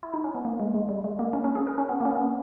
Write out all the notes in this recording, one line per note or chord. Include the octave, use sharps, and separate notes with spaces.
E4
D#4
C#4
B3
A#3
G#3
G#3
G3
G#3
A#3
C#4
C#4
G#4
A#4
C#4
B3
A#3
C#4
B3